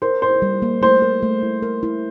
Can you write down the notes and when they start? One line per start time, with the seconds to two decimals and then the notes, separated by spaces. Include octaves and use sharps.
0.02 A#4 C5
0.22 E4 C5
0.42 G3
0.62 A#3
0.82 A3 C5
1.02 A#4
1.22 A3
1.43 E4
1.63 A#4
1.83 E4